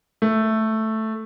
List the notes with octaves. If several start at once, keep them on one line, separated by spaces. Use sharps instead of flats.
A3